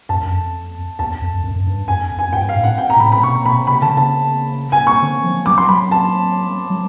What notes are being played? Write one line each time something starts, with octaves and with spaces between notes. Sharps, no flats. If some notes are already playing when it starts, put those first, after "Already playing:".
F#2 A5
F#2
F2
E2 A5
F2
F2
F#2
F#2
G2
F2 G#5
F2
G#5
G2 G5
F5
A2
F#5
G5
A#5
A#2
A2 B5
B5
B2 C#6
B2 B5
C3 B5
D3 A5
C#3
A5
G#5
C#6
D3
F3
F#3 D6
C6
F#3 B5
A5
F#3